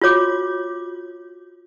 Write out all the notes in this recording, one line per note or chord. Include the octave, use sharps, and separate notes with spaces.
F4 F#4 C#5 D6